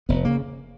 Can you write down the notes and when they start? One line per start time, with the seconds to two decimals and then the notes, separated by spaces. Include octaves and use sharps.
0.09 F1 B3
0.25 C#3 A#3